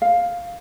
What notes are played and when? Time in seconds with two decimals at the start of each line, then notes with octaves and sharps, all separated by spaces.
0.02 F5